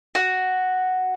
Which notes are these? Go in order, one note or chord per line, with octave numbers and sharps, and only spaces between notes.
F#4